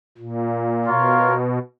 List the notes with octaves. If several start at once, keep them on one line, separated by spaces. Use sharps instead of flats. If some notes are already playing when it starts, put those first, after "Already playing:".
A#2
B2 F4 A#4 C#5 F5